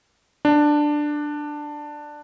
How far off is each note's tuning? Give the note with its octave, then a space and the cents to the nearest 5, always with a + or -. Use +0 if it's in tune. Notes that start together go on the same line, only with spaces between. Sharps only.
D4 +10